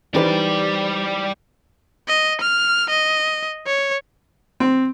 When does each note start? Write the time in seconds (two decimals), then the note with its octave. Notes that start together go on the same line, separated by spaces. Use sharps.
0.14 E3 G3 D#4 G4 B4 C5 D5
2.08 D#5
2.41 F6
2.90 D#5
3.67 C#5
4.60 C4